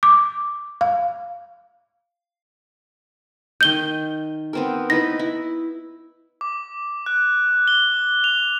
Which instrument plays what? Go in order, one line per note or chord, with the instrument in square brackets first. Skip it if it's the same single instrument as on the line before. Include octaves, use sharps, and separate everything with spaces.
[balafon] D6
F5
[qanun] D#3 D#5 [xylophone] G6 G7
[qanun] B3 C4 A#4
[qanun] D#4 E4 B4 [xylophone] A#6
[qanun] E4
[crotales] D6
F#6
G7
F7